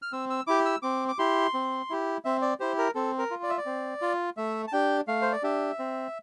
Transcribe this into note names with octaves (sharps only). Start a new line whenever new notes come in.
F6
C4 E6
E6
E4 G4 D6
E6
C4 D6
D6
E4 G4 C6
C4
E4 G4
C4 E5
D5
E4 G4 C5
A#4
C4 A4
A#4
F4
D5
E5
D5
C4
F4
A3 E5
A5
D4 G4 G5
A3 F5
C5
D5
D4 G4 E5
C4